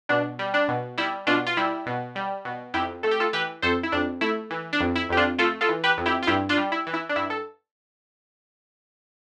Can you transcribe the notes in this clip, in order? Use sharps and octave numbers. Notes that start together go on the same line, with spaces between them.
B2 D4
G3
D4
B2
G3 E4
B2 D4 F4
F4
G3 E4
B2
G3
B2
F2 E4 G4
A3 A4
G4
F4 A4
E3 G4 B4
F2 A4 C5
E4
F2 D4
A3 E4
E3
D4
F2
E4
F2 G4
D4 F4
A3 F4 A4
F4 A4
E3
G4 B4
F2
E4 G4
F4
G2 E4 G4
D4 F4
G3
E4
E3
E4
D4
G2 E4
A4